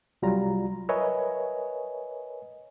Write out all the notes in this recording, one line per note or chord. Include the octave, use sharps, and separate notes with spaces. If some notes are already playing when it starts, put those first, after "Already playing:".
C2 F#3 G3 F4 A#5
A#4 B4 C#5 D#5 E5 G#5